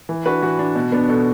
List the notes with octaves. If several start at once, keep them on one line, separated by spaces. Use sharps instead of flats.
E3
D4 F#4 B4
E3 F#4
D4
B2
B3 D4
B2 A4